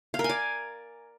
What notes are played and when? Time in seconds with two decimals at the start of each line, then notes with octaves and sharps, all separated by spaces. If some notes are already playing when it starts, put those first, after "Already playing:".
0.14 F5
0.19 A#4
0.24 G#5
0.29 D5